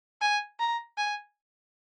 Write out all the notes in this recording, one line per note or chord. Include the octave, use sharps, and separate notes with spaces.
G#5
A#5
G#5